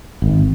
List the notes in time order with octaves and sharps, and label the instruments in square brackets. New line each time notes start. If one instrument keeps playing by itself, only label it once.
[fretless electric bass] G#1